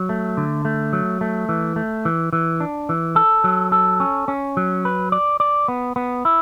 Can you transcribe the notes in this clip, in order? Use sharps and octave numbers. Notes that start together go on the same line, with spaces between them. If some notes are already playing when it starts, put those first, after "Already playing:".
Already playing: F#3
A3
D3
A3
F#3
A3
E3
A3
E3
E3
D4
E3
A4
F#3
A4
C#4
C#4
F#3
B4
D5
D5
B3
B3
E4